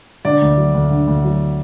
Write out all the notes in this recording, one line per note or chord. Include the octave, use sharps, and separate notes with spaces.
D3 D5
D2
F#3
D2
D3
D2
F#3